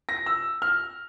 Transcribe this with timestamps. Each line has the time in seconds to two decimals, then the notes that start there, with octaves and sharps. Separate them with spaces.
0.09 A#6
0.26 E6
0.62 F6